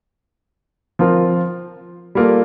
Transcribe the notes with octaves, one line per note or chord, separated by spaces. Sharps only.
F3 C4 F4 A#4
G3 A#3 F4 A4